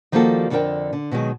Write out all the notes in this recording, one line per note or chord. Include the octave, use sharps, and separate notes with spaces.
D#3 F3 G3 A#3 F#4 A4
F2 D3 A#3 D4 A#4 G5
D3
B2 D#3 F#3 G#3